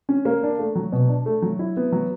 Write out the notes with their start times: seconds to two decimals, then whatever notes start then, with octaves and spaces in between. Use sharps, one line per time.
0.09 C#4
0.25 A#3
0.43 D4
0.59 A3
0.75 F#3
0.92 B2
1.09 D4
1.26 A3
1.42 F#3
1.59 E4
1.77 B3
1.92 F#3